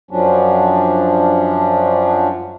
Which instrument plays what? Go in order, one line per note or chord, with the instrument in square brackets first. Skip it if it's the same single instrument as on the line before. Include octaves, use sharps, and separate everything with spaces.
[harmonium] F#2 F3 F#3 C#4 D4